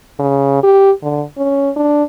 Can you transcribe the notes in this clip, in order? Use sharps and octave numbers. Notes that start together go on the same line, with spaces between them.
C#3
G4
D3
C#4
D4